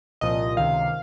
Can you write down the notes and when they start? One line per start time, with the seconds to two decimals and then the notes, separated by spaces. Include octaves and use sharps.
0.21 C2 A#2 F3 D#5
0.57 C#2 C3 D#3 F5